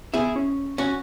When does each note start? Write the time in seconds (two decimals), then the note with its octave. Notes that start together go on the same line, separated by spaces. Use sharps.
0.14 B3 E4 G#4
0.36 C#4
0.78 C#4 F#4